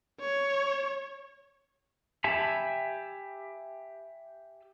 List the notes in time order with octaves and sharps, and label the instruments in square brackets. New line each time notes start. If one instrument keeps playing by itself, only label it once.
[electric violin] C#5
[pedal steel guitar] G4 E5 G#5 A5 B5